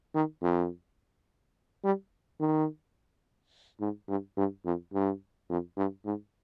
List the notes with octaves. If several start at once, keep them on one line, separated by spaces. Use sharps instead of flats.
D#3
F2
G3
D#3
G#2
G2
G2
F2
G2
F2
G2
G#2